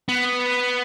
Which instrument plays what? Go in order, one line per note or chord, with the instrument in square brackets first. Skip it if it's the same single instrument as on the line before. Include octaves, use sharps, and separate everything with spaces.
[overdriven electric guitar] B3